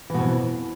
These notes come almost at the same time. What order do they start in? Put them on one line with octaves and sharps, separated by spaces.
E3 B2 F2